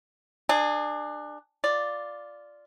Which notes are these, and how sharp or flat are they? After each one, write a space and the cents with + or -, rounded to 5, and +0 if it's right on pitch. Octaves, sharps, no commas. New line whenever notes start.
D4 +25 G#4 -5
F4 +0 D5 +0